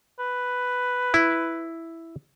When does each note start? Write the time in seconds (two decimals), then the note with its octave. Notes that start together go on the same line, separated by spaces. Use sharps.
0.19 B4
1.14 E4